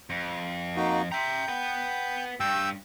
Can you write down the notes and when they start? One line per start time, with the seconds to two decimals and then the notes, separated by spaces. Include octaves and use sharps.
0.10 F2
0.76 A#3 D#4 F#4
1.12 E5 G5 A#5
1.48 B4 F#5
2.40 G2 G5 E6